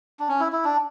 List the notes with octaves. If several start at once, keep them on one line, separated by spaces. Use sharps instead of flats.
D4
C#4
E4
E4
D4